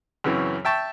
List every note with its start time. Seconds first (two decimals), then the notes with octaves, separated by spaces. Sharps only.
0.24 F#2 C#3 E3 C4
0.65 E5 G5 A5 C#6